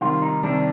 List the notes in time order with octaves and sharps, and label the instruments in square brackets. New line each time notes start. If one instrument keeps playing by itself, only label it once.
[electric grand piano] C3 D#3 G3 [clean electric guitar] F4
[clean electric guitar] D#4
[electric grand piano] C3 D#3 G3 [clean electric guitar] D4